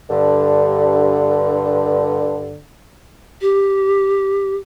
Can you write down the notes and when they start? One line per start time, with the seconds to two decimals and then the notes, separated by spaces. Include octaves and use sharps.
0.10 G2 D3
3.41 G4